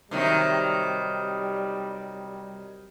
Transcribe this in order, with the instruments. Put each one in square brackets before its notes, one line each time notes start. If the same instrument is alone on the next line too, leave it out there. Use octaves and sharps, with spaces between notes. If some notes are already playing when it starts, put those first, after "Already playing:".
[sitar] C3 D#3 F#3 [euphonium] G3